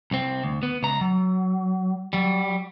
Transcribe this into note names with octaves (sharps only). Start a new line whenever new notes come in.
C2 C4
D2
B3
C#2 A#5
F#3
F#3 G3